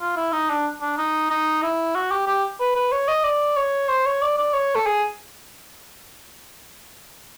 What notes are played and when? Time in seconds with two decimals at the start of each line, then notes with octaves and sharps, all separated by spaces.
0.01 F4
0.17 E4
0.33 D#4
0.50 D4
0.82 D4
0.98 D#4
1.30 D#4
1.63 E4
1.95 F#4
2.11 G4
2.27 G4
2.60 B4
2.76 B4
2.92 C#5
3.08 D#5
3.24 D5
3.57 C#5
3.89 C5
4.06 C#5
4.22 D5
4.38 D5
4.53 C#5
4.75 A4
4.86 G#4